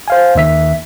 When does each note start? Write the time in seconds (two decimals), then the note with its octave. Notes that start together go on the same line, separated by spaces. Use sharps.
0.08 C5 F5 G#5
0.35 D#2 D#3 E5 B6